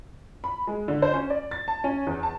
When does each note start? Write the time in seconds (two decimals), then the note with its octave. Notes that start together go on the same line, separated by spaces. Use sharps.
0.44 B5
0.67 G#3
0.88 D3
1.02 C5
1.14 C#4
1.30 D5
1.51 A6
1.68 A5
1.84 C#4
2.07 E2
2.23 A5